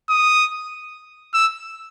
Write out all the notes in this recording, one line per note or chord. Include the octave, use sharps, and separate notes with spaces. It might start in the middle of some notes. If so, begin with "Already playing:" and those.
D#6
E6